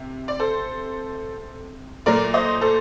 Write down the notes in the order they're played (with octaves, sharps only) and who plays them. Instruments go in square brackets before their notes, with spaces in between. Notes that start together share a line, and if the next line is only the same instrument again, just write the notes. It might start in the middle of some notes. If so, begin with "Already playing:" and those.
Already playing: [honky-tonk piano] C3
D5
A4 C5
A#2 F#3 A3 A#4 D5
C5 D#5
A4 C5